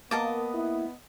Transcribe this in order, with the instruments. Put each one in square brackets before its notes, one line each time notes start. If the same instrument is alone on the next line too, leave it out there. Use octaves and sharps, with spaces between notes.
[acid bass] A#3 [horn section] B3 [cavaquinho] D#5 A5 D6
[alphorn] E4